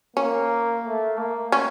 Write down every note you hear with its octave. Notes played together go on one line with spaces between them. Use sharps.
A#3 C#4
A3
A#3
C#4